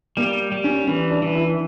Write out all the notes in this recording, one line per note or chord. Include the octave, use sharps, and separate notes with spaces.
G3 A#3
G3
C#4
E3 C#4
D4
E3
E4